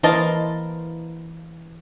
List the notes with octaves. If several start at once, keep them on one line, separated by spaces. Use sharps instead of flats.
E3 A#3 E4 C5 D#5 A5